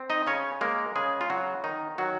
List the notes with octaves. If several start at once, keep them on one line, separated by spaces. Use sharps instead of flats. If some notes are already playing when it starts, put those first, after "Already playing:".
Already playing: C4
D#4 D#5
C#3 C#4 C#5
G#3 A#3 A#4
C#3 G#3 G#4
F4
C#3 F#3 F#4
D#3 D#4
D#3 F#3 F#4